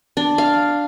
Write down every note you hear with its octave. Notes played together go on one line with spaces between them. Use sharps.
D4
F5